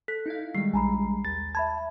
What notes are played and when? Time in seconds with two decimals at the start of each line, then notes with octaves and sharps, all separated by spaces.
0.08 A4 F#6 B6
0.26 D#4 E4 F5
0.55 D#3 G3 G#3 C7
0.74 A#1 G#5 A#5 B5
1.25 D#2 A6
1.55 E5 A5 B5 G#6